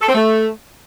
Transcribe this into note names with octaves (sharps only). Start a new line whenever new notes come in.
A4
C4
A3